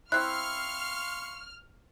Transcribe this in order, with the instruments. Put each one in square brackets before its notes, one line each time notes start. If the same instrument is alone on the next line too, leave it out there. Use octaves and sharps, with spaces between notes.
[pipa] C4 E4 [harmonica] F5 C6 C#6 [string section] F6 [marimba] F#6